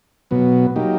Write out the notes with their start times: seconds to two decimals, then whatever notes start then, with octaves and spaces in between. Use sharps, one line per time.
0.31 B2 F#3 B3
0.76 F#3 A#3 D#4 G4